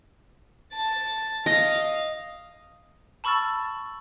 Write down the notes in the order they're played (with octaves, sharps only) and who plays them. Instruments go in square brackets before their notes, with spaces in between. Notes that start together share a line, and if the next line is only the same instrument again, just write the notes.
[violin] A5 A6
[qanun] D#5 [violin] F5
[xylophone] A5 B5 C#6 E6 F6 A6